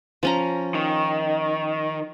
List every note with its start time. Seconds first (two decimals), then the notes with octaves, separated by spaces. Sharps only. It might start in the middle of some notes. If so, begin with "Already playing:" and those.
0.23 F3 C#4 A#5
0.74 D#3